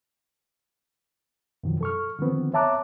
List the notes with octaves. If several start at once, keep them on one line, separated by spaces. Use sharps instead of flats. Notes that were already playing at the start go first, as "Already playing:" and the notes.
F#2 B2 D#3 F3 F#3
A4 C#6 F6
D3 D#3 F3 B3 C4
C#5 E5 A5 A#5 D6 F#6